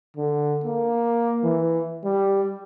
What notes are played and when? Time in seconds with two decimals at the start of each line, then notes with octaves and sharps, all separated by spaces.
0.17 D3
0.64 A#3
1.44 E3
2.05 G3